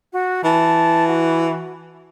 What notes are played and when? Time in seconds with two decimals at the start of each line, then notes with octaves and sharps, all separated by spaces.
0.13 F#4
0.44 E3 A5
1.08 F#4